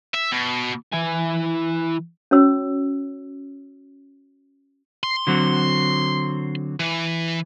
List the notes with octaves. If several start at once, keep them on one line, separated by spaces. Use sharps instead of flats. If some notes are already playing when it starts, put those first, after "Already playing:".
E5
B2
E3 G#5
C#4 F#4 C#5 E6
C6
D3 F#3 C4
E3